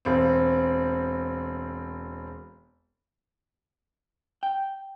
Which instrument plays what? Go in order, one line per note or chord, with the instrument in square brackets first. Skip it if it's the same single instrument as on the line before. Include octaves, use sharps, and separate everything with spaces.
[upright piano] E1 C4
[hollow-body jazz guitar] G5